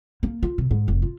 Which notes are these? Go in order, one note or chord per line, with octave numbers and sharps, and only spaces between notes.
A#3
F4
C3
G#2
F1
F4